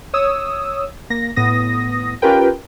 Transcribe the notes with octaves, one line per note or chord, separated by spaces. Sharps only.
C#5 D#6 E6
A#3 A#6
A2 B3 D#6 A#6
C#4 F4 G4 A#4 B4 G5